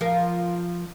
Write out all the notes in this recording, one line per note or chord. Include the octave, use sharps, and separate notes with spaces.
F3 A#4